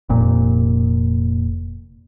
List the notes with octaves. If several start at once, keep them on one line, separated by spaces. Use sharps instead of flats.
F1 A#2